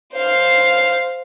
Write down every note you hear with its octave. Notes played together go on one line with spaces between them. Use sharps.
C5 F5